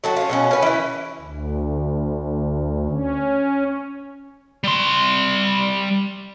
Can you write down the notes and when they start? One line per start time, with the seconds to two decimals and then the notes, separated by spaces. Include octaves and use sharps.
0.04 F#3 A3 F#4
0.17 C#4 F4
0.29 B2 F#3 C#4
0.51 C#4 B4
0.62 E3 E4
1.21 D2
2.91 C#4
4.64 G3 C6